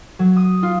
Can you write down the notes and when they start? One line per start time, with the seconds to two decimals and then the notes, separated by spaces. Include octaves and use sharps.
0.19 F#3
0.36 D#6
0.63 F4